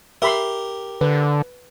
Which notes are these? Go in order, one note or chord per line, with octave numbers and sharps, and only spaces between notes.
G4 A#4 E5 B5 C6
D3 B4